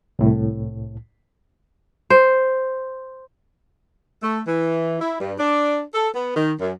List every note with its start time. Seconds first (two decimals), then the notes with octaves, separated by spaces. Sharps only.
0.19 C2 A2
2.10 C5
4.23 A3
4.48 E3
5.00 E4
5.20 G2
5.39 D4
5.95 A4
6.14 B3
6.37 D#3
6.60 F#2